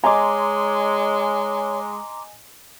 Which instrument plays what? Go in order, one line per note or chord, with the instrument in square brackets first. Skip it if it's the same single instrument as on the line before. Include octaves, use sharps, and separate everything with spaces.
[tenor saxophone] G#3 [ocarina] C#5 [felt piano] D#5 G#5 [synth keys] A#5 C6 D6